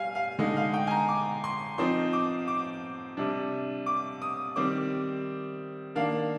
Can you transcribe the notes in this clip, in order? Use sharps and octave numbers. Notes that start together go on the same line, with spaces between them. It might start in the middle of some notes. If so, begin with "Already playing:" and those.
Already playing: G3 F5 G#5
F5
D3 G#3 D#4
F5
G5
G#5
A#5
D6
C6
F3 C4 D#4 C6
D6
D6
C3 G3 D4
D6
D#6
D#3 G3 C4 D6
D#3 A#3 D4 F5